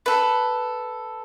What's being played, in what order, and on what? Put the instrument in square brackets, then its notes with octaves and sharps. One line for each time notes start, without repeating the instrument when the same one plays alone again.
[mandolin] A4 B4